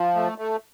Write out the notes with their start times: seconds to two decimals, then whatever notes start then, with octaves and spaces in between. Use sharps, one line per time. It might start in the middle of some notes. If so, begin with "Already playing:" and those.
Already playing: F3
0.15 A3
0.38 A3